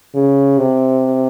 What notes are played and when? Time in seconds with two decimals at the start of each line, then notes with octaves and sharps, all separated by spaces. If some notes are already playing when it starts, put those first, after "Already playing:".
0.14 C#3
0.58 C3